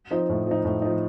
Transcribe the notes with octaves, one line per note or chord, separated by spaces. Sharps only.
F3 C4 D#4
A2
F3 C4 D#4
A2
F3 C4 D#4